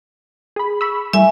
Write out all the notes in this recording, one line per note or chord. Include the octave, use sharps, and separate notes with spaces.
G#4 B5
B5 C#6 E6
G3 A3 E4 E5 G#5